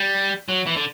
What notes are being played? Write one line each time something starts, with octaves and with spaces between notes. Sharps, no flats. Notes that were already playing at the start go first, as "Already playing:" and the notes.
Already playing: G3
F#3
E3
D3